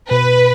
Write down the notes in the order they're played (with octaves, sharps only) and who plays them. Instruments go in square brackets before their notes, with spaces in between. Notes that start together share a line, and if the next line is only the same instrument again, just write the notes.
[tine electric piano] B2 [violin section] B4